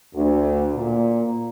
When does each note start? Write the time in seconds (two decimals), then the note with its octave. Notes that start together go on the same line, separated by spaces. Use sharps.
0.14 D2
0.74 A#2